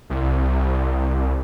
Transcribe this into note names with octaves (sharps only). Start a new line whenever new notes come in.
C2